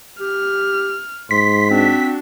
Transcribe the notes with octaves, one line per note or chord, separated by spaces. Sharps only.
G4 F6
G#2 C6 B6
C4 D4 F#4